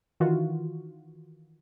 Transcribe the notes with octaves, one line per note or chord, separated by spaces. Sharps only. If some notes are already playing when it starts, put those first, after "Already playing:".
D#3 E3 F4 F#4